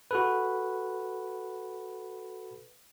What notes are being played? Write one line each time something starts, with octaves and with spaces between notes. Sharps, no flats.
F#4 A4 B4